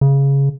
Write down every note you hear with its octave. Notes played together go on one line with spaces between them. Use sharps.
C#3